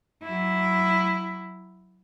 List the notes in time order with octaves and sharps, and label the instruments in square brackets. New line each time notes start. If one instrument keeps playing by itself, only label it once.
[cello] F#3 E4